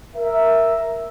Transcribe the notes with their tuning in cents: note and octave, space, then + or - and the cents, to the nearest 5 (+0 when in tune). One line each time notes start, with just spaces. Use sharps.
A#4 +0 E5 +0